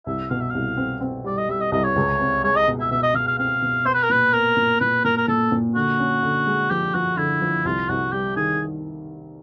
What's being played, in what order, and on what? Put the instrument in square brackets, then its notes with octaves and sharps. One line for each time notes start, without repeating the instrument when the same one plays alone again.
[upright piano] C2 [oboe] E5
[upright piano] B2 [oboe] F5
[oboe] E5
[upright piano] C2 [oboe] F5
[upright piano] C4
C4
[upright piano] G3 [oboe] D5
[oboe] D#5
[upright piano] G3 [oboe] E5
[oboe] D#5
[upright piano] C2 [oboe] D#5
[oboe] C#5
[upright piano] C#2
C4
[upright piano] G#3 [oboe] C#5
[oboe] D#5
[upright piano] B2
[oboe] E5
[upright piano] B2 [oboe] E5
[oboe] D#5
[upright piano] B2 [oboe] F5
[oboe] F5
[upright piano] C4 [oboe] F5
[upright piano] B2
[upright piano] B3 [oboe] C5
[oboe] B4
A#4
[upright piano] A#2 [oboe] B4
[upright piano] B3 [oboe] A#4
[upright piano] A#2
[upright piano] A#2 [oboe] B4
[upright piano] A#2 [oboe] A#4
[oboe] A#4
[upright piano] A#2 [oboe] A4
[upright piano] A#2
[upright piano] D3 [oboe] F#4
[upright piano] C#4
D3
G#3
[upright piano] F3 [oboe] G4
[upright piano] F3 [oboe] F#4
[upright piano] D3 [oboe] E4
[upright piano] F3
[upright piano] C2 [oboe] F4
[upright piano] C2 [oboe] F#4
[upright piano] G3 [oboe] G4
[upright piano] D#3 [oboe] G#4